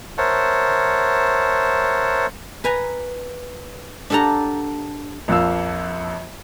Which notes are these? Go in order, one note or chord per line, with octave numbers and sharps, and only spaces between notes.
A#4 C5 C#5 E5 F#5 A5
B4 G#5 A#5
D4 G4 A4 F#5 A#5
A#1 F2 A#3 F5 E6